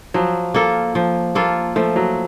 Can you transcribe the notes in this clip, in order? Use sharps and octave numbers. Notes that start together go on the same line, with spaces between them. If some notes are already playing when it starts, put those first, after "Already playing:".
F3 F#3
A#3 F4 A4
F3
A#3 F4 A4
F3 A3
F#3